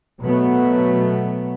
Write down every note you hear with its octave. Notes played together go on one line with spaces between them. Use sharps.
B2 F#3 A3 B3